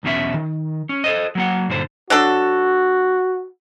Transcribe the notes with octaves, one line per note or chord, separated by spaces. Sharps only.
B1 E2 B2 C#4 E5
D#3
C#4
A4 C5 D#5
F#3 A#3 F#5
G2 A#2 D3 C5
F#3 D4 F#4 A4